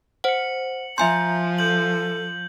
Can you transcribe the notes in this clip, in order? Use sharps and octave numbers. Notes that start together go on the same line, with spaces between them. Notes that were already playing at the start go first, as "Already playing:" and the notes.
C5 F#5 C#7 F#7
F3 E5 G#5 A#5 C6 G6
A4 G6 F#7